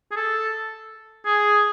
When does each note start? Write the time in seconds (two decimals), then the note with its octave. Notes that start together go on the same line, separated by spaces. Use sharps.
0.11 G#4
0.16 A4
1.26 G#4